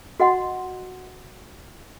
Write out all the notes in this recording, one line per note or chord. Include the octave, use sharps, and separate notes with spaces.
F#4 D#5 F#5 C6